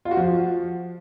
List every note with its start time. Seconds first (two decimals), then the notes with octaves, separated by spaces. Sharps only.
0.05 F4
0.11 F#4
0.17 F3